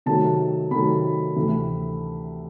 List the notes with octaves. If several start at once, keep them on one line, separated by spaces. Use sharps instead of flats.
C3 D#3 F#3 A3 A5
C3 D#3 F#3 A3 B5
D2 C3 E3 A3